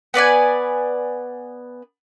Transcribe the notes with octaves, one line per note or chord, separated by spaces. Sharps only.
B3 B4 D5 G#5